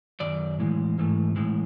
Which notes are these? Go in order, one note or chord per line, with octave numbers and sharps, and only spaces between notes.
F#2 D#3 F#3 D5
A2 E3 G#3
G#2 E3 A3
A2 E3 G#3